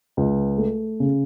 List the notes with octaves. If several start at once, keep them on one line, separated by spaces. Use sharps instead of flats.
C#2
A3
C#3